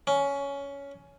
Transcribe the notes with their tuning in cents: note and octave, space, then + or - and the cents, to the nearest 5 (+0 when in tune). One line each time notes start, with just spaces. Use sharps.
C#4 +15